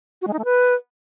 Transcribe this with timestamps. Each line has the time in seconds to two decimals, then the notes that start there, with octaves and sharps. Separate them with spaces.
0.22 F#4
0.27 G#3
0.33 D#4
0.39 A3
0.45 B4